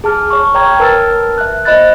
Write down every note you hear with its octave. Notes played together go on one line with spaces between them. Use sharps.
G#4 A5 F6
C#5 C#6
C#5 G5 A#5 F6 G#6
A#4 B4 A5 E6 F6 A6
E5 F#6
C5 D#5 B5 F#6 A6